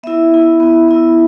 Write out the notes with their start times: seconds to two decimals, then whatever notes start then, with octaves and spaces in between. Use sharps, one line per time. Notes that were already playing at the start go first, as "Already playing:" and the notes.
0.03 B3 E4 E5
0.32 B3 E4
0.60 B3 E4
0.88 B3 E4